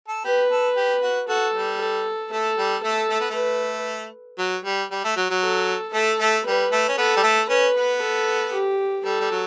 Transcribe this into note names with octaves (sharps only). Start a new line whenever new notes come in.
A4
G4 B4
A4
G4
F#4
F#4 A4
G3
A4
A3 A4
G3
A3 A4
A3
B3
A3
B4
F#3
G3
G3
A3
F#3
F#3
A4
A3 A4
A3
G3 B4
A3
C#4
B3 A4
G3
A3
C#4 B4
B3
A4
G4
G3 A4
G3
F#3